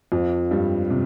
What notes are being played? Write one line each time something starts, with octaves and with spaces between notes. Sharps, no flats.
F2 F3
G2 G3
C3